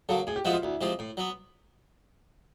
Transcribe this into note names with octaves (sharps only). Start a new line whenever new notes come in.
C#3 F#3 A#3 A4
A2 G#4
G4
F3 G#3 B3 E4 F#4
F4
D2 E4
C3 F3 G#3
A2
F#3 B3